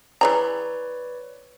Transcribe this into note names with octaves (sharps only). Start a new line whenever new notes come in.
E3 G#4 B4 C#5 D5 A#5